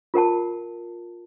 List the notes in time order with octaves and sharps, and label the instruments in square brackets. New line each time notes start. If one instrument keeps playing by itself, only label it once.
[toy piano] F4 A#4 F#5 A5